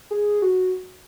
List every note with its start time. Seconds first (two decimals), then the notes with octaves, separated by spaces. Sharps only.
0.11 G#4
0.42 F#4